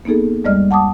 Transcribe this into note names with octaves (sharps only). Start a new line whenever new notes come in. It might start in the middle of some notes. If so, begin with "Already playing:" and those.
A#3 B3 D#4 G#4 A4
F2 G3 G#3 D5 D#5 F6
F#5 A5 D6 D#6